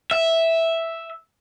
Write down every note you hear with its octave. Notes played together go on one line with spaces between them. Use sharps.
E5